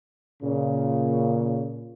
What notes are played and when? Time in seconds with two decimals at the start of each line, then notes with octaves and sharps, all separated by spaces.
0.43 A#2 C#3